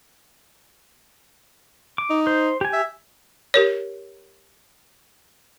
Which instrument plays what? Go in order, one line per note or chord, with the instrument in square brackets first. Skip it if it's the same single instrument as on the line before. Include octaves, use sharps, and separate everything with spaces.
[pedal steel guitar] D6
[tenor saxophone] D#4
[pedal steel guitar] C5
G4 G#5
[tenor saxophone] E5
[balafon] G4 A#4 C#5